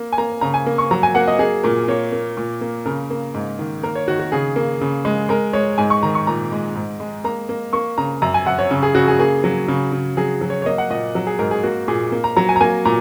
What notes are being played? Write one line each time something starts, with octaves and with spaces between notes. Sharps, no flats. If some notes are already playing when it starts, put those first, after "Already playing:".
Already playing: A#3
G#5
A#3 A#5
C#3 A#5
G#5
A#3
C#6
F#3 A#5
G#5
A#3 F#5
D#5
A#3 G#4
A#2 A#4
A#3 C#5
A#3
A#2
A#3
C#3 A#4
A#3
G#2
D#3
A#3 A#4
C#5
D#3 F#4
F#4
C#3 G#4
A#3
C#3
G#3
G#3 A#4
G#3 C#5
G#2 G#5
C#6
D#3 A#5
C#6
A#2 A#5
G#3
G#2
G#3
A#3 A#5
A#3
A#3 C#6
C#3 A#5
F#2 A#5
G#5
F#2 F#5
C#5
C#3
G#4
C#3 F#4
G#4
A#3 G#4
F#3
C#3
C#3
F#3 G#4
F#3
C#5
C#5
A#3 D#5
F#5
A#2 D#5
F#3
G#4
G#2 A#4
G#4
A#3 F#4
A#2 G#4
A#3
A#5
F#3 A#5
G#5
A#5
A#3 G#5
A#2 A#5